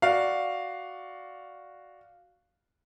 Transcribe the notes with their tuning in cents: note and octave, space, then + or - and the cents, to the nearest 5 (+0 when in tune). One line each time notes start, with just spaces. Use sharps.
F#4 +0 D5 +0 F5 +0